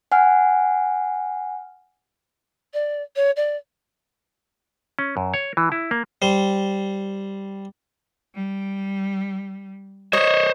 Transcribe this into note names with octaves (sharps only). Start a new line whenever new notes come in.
F#5 G#5 F6
D5
C#5
D5
C#4
F#2
C#5
E3
E4
A#3
G3 C5
G3
C5 C#5 D#5